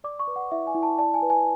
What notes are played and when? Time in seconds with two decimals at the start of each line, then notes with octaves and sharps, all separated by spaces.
0.04 D5 D6
0.20 C#6
0.27 B4
0.36 F#5
0.51 E4 E5
0.67 G#5
0.75 E4
0.83 A5
0.98 D5 A5
1.14 G#5
1.22 B4
1.30 G#5